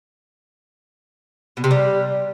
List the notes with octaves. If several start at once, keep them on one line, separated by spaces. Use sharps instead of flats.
B2
C3
G3